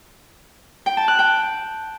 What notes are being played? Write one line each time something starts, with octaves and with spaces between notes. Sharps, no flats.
G5
A5
F#6
G5